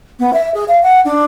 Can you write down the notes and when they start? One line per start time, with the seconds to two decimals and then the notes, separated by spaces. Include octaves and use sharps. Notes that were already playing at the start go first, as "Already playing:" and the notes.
0.19 B3
0.33 E5
0.54 G#4
0.68 F5
0.83 F#5
1.05 D4